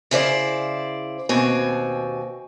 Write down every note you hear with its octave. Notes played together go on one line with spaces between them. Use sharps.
C#3 E4 C5 D5
D#2 B2 C4 G#5